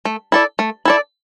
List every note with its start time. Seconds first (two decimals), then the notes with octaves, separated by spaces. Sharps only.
0.05 A3
0.32 E4 A4 D5
0.59 A3
0.85 E4 A4 D5